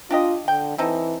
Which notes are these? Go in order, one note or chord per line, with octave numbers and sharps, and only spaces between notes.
D4 F4 G4 D#5
D3 G5
E3 C4 D#4 A4